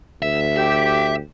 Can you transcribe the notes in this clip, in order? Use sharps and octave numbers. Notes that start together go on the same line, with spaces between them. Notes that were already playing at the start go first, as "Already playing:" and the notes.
D2 E5
G4 E5